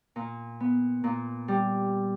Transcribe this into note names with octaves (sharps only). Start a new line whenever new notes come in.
A#2
B3
A#2
G3